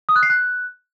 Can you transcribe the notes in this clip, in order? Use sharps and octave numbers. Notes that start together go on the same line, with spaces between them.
D#6
F#6
C7
F#6